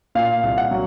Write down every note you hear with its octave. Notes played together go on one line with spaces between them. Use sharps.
A#2 F5
C2
F#5
F#3